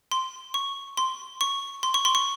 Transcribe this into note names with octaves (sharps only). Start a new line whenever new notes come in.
C6
C#6
C6
C#6
C6
C#6
C6
C#6